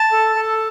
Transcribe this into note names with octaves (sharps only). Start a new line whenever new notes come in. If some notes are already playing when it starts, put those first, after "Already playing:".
Already playing: A5
A4
A4